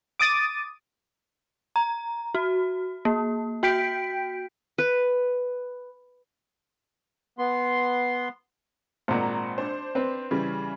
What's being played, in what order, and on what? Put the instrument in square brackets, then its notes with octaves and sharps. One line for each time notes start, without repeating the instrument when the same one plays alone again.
[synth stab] D6 D#6 A6 D#7
[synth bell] A#5
F#4
A#3
F#4 G5 G6 B6 D7
[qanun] B4
[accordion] B3 C6
[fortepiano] G#1 A#2 [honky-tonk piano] F#5 A#5
[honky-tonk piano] D4 C5
[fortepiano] C4 B4
[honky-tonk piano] C#3 E3 G3